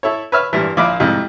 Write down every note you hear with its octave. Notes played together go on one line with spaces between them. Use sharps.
E4 A4 C#5
B4 C#5 E5 F6
G2 A#2 E3
A#1 A#2 E4 F4 B5 D6
C2 F2 G#2